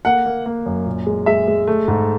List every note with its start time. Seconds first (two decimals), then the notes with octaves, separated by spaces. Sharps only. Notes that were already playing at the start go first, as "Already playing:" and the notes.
0.05 A#3 F#5
0.26 A#3
0.46 A#3
0.66 F#2
0.86 A#2
1.06 G#3
1.26 G#3 E5
1.48 G#3
1.67 A3
1.88 G#2